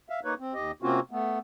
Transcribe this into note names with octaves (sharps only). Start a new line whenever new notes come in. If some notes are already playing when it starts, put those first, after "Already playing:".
E5 F5
A#3 D#4 B4 C#5
C4
D#2 G4 D#5
C3 A#3 C4 C#4 F4 F#4
A3 B3